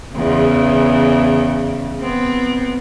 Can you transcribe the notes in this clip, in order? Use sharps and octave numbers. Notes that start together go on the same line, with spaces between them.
E2 C#3
B3 C4